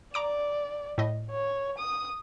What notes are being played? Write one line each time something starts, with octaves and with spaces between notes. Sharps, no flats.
D5 A#5 D6 D7
A2 D#5
C#5
D#6